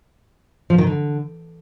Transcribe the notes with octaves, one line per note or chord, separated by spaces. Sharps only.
F3
D#3
D3